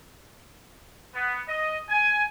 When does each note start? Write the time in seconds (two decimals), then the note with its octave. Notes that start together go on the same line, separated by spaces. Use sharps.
1.15 B3
1.49 D#5
1.90 G#5